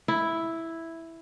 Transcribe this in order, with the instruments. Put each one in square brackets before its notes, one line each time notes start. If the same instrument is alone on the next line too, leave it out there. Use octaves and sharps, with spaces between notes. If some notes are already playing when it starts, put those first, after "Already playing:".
[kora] E4